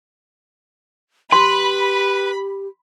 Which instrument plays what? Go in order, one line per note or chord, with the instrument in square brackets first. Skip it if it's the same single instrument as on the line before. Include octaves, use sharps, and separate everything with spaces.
[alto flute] G4 [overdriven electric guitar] B4 [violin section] B5 [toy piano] C6